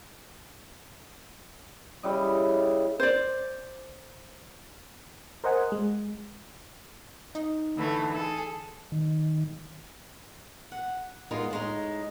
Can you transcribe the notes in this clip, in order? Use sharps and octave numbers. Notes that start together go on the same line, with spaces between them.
C#3 G3 E4 D#5
C5 D5
A#4 C5 D#5 F#5 G#5
G#3
D#4
D3 E3 A3
G#4 A4
D#3
F#5
F#3 G#3 B3 D#4 F4 A#4
A2 G#3 D#4